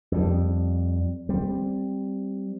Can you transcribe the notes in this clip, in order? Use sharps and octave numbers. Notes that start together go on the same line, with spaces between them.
F2 G3
G3 C4